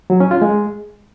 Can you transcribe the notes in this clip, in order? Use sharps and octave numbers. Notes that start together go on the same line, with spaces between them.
F#3
C#4
F4
G#3